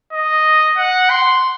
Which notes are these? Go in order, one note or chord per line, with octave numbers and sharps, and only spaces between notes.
D#5
F#5
C6